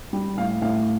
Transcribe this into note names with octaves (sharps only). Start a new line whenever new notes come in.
G3
A2 F5
A2 F5